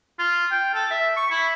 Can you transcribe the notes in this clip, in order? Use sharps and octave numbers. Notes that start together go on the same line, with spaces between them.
F4
G5
A4
E5
C#6
E4